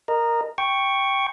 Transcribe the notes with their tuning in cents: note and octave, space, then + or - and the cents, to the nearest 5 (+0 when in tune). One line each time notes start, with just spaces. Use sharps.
A#4 +0 D#5 -20
G5 +0 C#6 +0